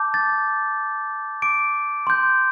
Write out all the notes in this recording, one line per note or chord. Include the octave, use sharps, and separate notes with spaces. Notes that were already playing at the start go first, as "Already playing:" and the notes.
Already playing: A5 D6 G6
A6
D6 D7
C6 G6